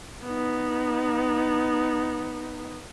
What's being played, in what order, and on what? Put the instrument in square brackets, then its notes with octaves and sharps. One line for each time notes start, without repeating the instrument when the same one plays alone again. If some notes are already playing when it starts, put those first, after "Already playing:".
[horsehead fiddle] B3 D#4